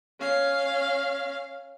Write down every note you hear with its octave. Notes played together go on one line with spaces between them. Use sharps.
C#4 F5